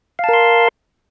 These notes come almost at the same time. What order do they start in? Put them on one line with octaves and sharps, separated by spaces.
F5 A5 A#4 C6